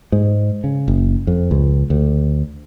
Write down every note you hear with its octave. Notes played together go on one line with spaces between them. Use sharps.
G#2
C#3
F#1
F2
C#2
D2